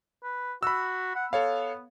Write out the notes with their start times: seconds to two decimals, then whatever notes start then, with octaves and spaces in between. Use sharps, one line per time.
0.23 B4
0.63 F#4 B5 E6
1.15 F#5
1.33 B3 A4 C#5 F5